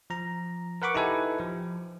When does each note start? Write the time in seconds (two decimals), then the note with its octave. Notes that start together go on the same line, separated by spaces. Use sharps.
0.10 F3 A#5
0.82 A#4 B4 F#5 B5 C#6 D6
0.95 D#4 E4 G4 A4 B4 G#5
1.40 F3